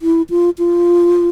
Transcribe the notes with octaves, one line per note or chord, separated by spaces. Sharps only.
E4
F4
F4